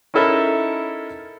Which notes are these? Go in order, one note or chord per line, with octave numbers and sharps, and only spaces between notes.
C#4 D#4 E4 A4 A#4 E5